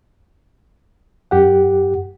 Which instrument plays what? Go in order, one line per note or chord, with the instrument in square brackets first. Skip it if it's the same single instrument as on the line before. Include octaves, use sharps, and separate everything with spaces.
[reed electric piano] F#2 G4 F#5